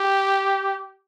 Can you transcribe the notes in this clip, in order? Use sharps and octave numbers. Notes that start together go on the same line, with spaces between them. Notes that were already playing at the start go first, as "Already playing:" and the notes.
Already playing: G4